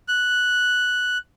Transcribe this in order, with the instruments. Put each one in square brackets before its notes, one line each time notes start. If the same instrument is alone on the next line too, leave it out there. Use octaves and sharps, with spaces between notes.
[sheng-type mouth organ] F#6